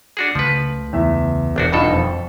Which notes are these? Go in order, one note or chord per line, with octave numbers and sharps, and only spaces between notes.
D4 F#4 G#4
C#2 C#3 F3 A3 B4
E2 E3 E5
E1 A#1 D4 F#4
G2 B2 D4 D#4 F4 A4
F2